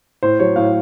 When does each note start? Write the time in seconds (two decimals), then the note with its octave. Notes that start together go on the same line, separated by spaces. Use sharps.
0.23 A2 C5
0.40 F#3 C#5
0.56 A2 F5